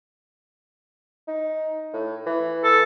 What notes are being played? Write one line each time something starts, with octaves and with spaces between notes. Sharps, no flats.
D#4
A2
E3
A4